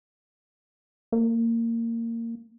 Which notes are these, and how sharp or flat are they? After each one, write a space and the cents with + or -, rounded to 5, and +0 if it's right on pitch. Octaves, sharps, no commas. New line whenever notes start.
A#3 -20